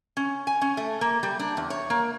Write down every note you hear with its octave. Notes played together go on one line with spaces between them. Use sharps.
C#4
G#5
C#4
A3
A#3
G3
D4
E2
C#5
A#3